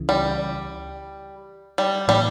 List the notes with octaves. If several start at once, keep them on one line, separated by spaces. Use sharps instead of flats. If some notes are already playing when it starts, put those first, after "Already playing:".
Already playing: C#2 C#3 E3
G3
G3
A2 E3 G3 A#3